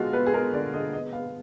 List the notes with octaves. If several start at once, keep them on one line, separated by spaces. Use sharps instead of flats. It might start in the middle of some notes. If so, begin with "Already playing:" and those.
Already playing: D3 G#3 B3 F4 F#4
B3 B4
G#4
G#3 A#4
D3 D5
D3 D#5
B3 D#5
B3 F5